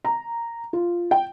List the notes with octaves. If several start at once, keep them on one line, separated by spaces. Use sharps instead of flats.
A#5
F4
G5